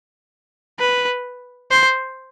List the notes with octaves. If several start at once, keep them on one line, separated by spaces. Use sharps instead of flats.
B4
C5